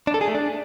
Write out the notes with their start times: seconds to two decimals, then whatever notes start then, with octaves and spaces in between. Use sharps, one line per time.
0.07 D4
0.14 A4
0.21 G#4
0.28 A3
0.35 D4